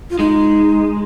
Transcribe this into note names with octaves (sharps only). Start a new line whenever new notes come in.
F4
G#3 D#4